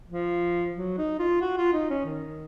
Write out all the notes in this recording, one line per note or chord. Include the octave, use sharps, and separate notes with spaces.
F3
F#3
D#4
F4
F#4
F4
D#4
C#4
D#3